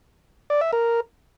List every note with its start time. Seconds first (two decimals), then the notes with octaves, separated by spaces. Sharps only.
0.50 D5
0.61 E5
0.73 A#4